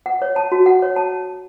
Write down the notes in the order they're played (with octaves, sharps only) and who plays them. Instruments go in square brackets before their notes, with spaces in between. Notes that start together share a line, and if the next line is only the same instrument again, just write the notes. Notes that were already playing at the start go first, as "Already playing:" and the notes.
[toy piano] F#5
C#5
A5
F#4
F#5
C#5
A5